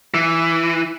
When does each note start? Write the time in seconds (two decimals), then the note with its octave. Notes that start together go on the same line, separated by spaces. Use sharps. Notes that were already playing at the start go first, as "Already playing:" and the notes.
0.14 E3